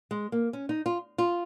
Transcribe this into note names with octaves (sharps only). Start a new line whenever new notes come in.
G#3
A#3
C#4
D#4
F4
F4